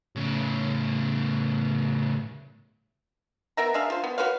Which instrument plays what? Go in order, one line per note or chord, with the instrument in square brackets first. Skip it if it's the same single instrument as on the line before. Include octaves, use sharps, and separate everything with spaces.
[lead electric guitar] A2 C#3
[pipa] B3 A#4 E5 A#5
D4 G#4 E5 F5
F4 C5
B3
F#4 B4 C#5 F5